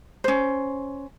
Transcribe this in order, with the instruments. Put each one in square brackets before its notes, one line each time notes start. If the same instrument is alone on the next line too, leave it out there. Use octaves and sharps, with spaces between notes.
[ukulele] C#4 C5